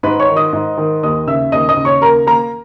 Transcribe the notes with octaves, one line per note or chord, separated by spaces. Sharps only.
G#2 B4 B5
C#5 C#6
D#3
D#5 D#6
G#2
D#3
D#2 D#5 D#6
C#3 E5 E6
D#2 D#5 D#6
D#5 D#6
C#3
C#5 C#6
A#3 A#4 A#5
A#3 A#4 A#5